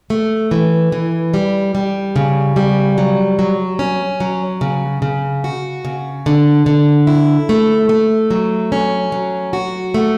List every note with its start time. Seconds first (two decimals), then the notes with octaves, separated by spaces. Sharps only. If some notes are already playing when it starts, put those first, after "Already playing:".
0.10 A3
0.51 E3
0.92 E3
1.34 G3
1.75 G3
2.16 C#3
2.56 G3
2.98 F#3
3.39 F#3
3.79 C#4
4.20 F#3
4.61 C#3
5.02 C#3
5.44 F#4
5.85 C#3
6.26 D3
6.66 D3
7.07 E4
7.49 A3
7.89 A3
8.30 F#3
8.72 C#4
9.12 F#3
9.53 F#4
9.94 A3